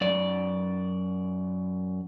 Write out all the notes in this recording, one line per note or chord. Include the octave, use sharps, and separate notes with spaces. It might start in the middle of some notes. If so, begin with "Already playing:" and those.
F#2 D5